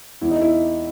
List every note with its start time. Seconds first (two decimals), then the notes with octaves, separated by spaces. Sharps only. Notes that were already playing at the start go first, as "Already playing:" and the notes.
0.21 E2 E4
0.31 D#4
0.41 E4